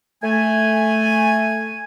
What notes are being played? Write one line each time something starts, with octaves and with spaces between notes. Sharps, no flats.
A3 G#5